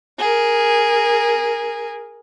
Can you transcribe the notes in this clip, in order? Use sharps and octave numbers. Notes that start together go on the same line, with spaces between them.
G#4 A#4